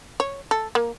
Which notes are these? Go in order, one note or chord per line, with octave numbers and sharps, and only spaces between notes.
C#5
A4
A#3